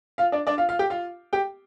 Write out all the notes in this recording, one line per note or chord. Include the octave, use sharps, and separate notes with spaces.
F4 F5
D4 D5
D4 D5
F4 F5
F4 F5
G4 G5
F4 F5
G4 G5